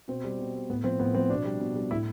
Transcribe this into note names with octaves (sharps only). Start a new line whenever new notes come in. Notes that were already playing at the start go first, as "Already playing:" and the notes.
B2 C4
G3
B2
G3
A2 B3
F3 C4
A2 B3
F3 C4
B2 D4
G3
B2
G3
A2 E4